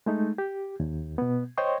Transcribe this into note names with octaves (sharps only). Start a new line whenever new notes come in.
G#3 A3 D#4
G4
D#2
B2 B3
C5 C#5 D#5 G5 C6 C#6